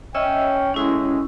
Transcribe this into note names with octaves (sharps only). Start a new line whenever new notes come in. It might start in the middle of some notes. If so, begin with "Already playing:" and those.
C#4 D#5 E5 G5 E6
A2 G#3 C#4 E4